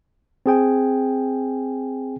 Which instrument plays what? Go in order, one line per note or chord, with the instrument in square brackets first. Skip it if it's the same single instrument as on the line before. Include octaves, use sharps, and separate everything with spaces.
[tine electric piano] C4 G#4 G5 G#5